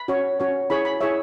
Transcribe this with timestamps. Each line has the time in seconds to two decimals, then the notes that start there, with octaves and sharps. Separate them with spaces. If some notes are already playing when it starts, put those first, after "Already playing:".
Already playing: B5
0.08 C#4 F#4 C#5
0.40 C#4 F#4 C#5
0.70 E4 G#4 C#5 B5
0.85 B5
1.01 E4 G#4 C#5 E5